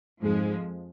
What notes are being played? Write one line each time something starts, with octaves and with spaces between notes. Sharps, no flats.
F2 G#2 F3 G#3